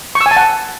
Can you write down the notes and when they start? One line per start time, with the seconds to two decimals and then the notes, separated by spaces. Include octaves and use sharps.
0.15 C#6
0.21 E6
0.26 G#5
0.31 A5
0.36 F#5